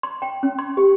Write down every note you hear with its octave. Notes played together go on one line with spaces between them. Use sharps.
C6
G5
C#4
C6
G4